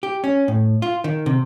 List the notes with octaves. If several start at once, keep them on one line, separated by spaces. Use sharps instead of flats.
G4
C#4
A2
F4
D#3
C3